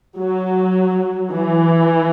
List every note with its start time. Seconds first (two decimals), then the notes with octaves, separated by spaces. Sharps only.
0.18 F#3
1.31 E3